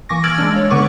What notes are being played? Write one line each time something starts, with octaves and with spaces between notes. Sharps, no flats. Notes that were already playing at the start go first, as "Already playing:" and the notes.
E3 A#3 G#5 C#6 D6 A#6
E6 F6 G#6 A6 D7 F#7
G#3 A#3 D4
C#5
D3 B3 B4 C#6 D6